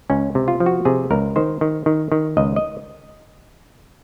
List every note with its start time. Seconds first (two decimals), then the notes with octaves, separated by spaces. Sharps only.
0.10 C#2 C#4
0.35 C3
0.48 F4
0.60 F3
0.66 F#4
0.85 C3 G#4
1.11 C#2 A#4
1.36 D#3 C5
1.61 D#3
1.86 D#3
2.12 D#3
2.37 C#2 D#5
2.56 D#5